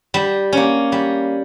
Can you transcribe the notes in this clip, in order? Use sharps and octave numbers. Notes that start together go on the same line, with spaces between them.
G3
A#3 C#4
G3